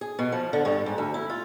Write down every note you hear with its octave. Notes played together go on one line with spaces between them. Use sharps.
G#4
B2
F3
D3
G2
G#2
D2
E4
F4